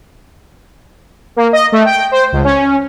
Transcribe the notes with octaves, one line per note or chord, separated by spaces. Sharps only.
A#3
D#5
A3
G5
C5
C#2
C#4